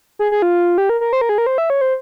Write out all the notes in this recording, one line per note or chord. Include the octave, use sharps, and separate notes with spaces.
G#4
G#4
F4
G4
A#4
A#4
C5
A#4
G#4
A#4
C5
E5
C#5
C5